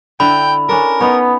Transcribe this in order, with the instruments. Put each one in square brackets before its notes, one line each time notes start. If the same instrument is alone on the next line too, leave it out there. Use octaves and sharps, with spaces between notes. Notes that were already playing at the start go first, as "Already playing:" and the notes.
[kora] D3 E4 [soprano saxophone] G5 [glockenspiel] B5
[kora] C#4 D4 A4 [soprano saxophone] A#4
[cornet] B3 [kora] D#4 C#5